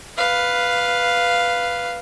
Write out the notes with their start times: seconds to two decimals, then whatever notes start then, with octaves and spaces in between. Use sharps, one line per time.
0.17 B4 F5